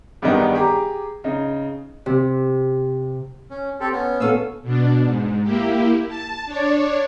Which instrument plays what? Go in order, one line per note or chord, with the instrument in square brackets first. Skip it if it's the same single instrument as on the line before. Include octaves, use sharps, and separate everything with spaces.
[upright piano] E2 G2 D#3 G3 B3 D#4
G4 G#4 A#5 D6
C#3 D#4
[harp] C3
[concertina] C#4
C4 G4 A4
B3 C#4
[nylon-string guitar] B3 C#4 A4 [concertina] F5 E6
[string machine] B2 D4
G#2
A#3 E4 G4
A5
D4 C#5 D5